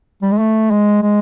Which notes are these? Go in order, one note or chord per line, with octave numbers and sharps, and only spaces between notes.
G3
G#3
A3
G#3
G#3